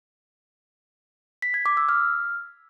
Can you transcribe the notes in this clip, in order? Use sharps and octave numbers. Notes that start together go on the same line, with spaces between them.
B6
G#6
D6
E6
F6